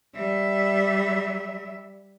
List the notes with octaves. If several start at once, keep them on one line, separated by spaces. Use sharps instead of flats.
G3 E5